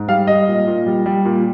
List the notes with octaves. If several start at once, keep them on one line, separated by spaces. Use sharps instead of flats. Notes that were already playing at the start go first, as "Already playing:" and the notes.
Already playing: G#2
G3 F5
G3 D#5
A#2
A#2
G3
G3
A#2